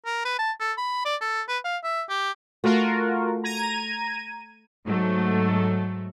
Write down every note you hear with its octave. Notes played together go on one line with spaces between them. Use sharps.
A#4
B4
A5
A4
B5
D5
A4
B4
F5
E5
G4
A3 F4 F#4 A#4
A#5 G#6 D#7
G#2 F#3 A3